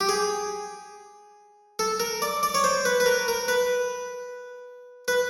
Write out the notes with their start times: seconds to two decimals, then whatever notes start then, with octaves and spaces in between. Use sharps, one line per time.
0.01 G4
0.09 G#4
1.79 A4
2.00 A#4
2.22 D5
2.43 D5
2.54 C#5
2.64 C5
2.85 B4
3.00 B4
3.06 A#4
3.28 A#4
3.48 B4
5.08 B4